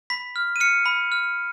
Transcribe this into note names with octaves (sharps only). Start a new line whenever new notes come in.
B5 B6
F6
D#7
F6 C#7
B5
F6